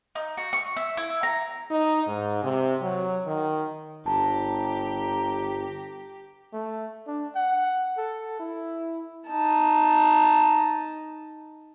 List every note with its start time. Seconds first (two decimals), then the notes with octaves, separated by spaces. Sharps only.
0.15 D#4
0.37 F#4
0.53 C#6
0.77 E5
0.97 E4
1.23 A#5
1.71 D#4
2.08 G#2
2.44 C3
2.82 F#3
3.27 D#3
4.06 G1 G4 A5 A#5
6.53 A3
7.07 D4
7.35 F#5
7.97 A4
8.40 E4
9.27 D#4 A5